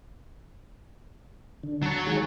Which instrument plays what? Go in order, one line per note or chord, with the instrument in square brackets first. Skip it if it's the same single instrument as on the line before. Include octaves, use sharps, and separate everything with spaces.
[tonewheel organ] D3
[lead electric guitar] F#3 C#5 [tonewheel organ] A5
[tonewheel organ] D#3 G#3 G#4